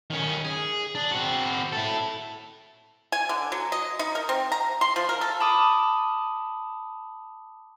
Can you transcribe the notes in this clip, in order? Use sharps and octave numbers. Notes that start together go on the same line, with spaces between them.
D#3 C#4
G#4
D4
C4 F#4
E4 A4
G#5
D3
F#3
D#5
D#4
A#4
C4
A#5
C6
F3
A#4
A4
A5 B5 D6 D#6